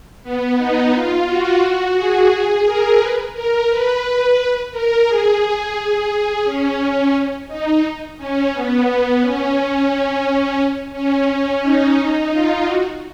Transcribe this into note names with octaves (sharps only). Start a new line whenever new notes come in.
B3
D#4
F4
F#4
F#4
G#4
G#4
A#4
B4
A#4
B4
B4
A#4
G#4
G#4
C#4
D#4
C#4
B3
B3
C#4
C#4
C#4
C#4
D#4
D#4
F4
F#4